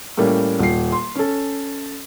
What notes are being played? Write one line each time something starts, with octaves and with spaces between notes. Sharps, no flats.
A2 G3 A#3 C#4
D#1 C7
C6
C#4 A4